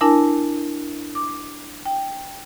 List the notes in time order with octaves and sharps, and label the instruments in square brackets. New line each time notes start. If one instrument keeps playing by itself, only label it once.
[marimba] D4 E4 A#4 G#5 A5
D6
G5